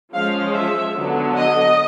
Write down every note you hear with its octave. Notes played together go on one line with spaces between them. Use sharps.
F3 G#3 C#4 F5
E5
D3 F#3 B3
D#5